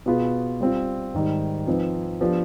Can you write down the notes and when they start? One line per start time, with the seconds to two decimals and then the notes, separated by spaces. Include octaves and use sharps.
0.06 B2 B3 F4 G#4 B4
0.60 G3 C4 F4
1.14 G#2 D#3 G3
1.67 F3 C4 D#4 B4
2.21 F3 B3 D4 G4